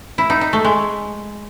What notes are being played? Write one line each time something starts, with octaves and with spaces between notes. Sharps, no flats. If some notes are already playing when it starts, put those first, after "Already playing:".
E4
D#4
D#4
A3
G#3